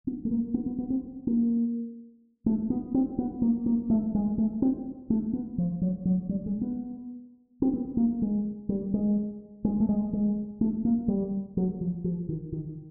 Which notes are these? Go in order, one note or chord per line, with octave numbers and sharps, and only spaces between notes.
B3
A3
A#3
B3
B3
B3
C4
A#3
A3
B3
C4
B3
A#3
A#3
A3
G#3
A3
C4
A3
B3
F3
F#3
F#3
G3
G#3
B3
C4
B3
A#3
G#3
G3
G#3
G#3
A3
G#3
G#3
A3
A#3
G3
F#3
F3
F3
D#3
D#3